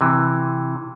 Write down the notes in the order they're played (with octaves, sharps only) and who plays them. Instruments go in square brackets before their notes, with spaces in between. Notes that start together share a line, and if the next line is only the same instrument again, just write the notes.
[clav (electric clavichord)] C3 E3